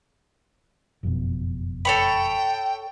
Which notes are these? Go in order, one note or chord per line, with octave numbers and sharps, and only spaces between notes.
F#1 F2 B2
A4 C#5 G5 B5